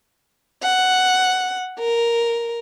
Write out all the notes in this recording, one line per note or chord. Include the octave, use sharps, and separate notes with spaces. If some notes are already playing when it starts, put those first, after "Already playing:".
F#5
A#4